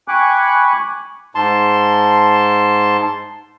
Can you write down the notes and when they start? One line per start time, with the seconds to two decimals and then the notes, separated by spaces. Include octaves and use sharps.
0.08 G5 G#5 B5 C#6 D6 F#6
1.35 G#2 A5 C6